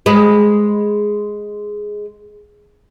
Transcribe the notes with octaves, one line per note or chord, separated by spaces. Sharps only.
G#3 B4